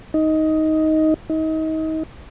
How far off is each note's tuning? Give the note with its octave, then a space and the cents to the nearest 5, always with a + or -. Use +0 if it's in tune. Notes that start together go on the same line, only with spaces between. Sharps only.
D#4 +10
D#4 +30